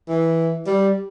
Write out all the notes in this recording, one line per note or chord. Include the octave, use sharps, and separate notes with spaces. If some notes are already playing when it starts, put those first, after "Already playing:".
E3
G3